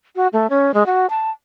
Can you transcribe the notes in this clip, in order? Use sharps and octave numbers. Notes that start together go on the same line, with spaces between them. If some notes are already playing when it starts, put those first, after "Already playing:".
F#4
A3
C#4
G#3
F#4
A5